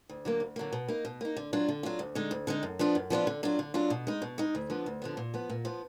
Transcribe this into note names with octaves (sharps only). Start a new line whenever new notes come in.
D2
D3 F#3 A#3
D2
D3 F#3 A#3
B2
A#3 D#4
B2
A#3 D#4
D3
F#3 D4 F4
D3
F#3 D4 F4
D2
D3 G#3 D#4
D2
D3 G#3 D#4
F#2
F3 B3 D4 F4
F#2
F3 B3 D4 F4
D3
F#3 D4 F4
D3
F#3 D4 F4
B2
G#3 D#4
B2
G#3 D#4
D2
D3 F3 B3
D2
D3 F3 B3
A#2
F3 B3
A#2
F3 B3